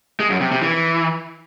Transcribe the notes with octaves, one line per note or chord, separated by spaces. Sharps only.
G#3
F#2
C3
C3
E3